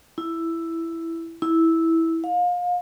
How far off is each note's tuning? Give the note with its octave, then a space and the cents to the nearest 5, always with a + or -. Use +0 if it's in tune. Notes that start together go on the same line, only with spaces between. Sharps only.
E4 +5
E4 -10
F5 +30